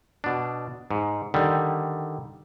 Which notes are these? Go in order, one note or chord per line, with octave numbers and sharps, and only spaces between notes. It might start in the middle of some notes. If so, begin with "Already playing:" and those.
B2 D4
G#2
D3 D#3 G3